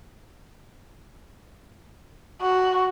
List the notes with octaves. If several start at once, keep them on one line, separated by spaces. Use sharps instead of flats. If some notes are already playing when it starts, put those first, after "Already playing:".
F#4